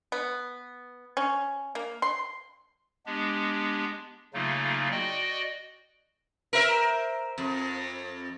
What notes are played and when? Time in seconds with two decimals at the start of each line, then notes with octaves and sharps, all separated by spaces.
0.12 B3
1.17 C#4
1.75 A#3
2.02 C6
3.06 G#3 B3 D4 G4
4.34 C#3 F#3 A3 A#3 D#4 F4
4.91 F#4 D5 D#5 G5
6.53 A#4 C5 E5
7.38 F2